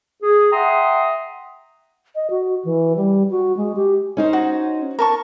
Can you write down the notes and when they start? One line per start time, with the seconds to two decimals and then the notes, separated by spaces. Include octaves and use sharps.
0.22 G#4
0.52 E5 F#5 G5 A#5 C6 D#6
2.15 D#5
2.30 F#4
2.65 E3
2.96 G3
3.31 F#4
3.57 G#3
3.76 G4
4.17 C#4 D#4 C5
4.33 F#4
4.99 A#4 A5 C#6